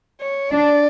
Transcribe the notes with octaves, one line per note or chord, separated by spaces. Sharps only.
C#5
D4 D5